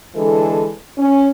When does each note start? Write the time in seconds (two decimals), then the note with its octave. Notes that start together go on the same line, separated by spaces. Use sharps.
0.15 D3 E3 G#3 A4
0.97 C#4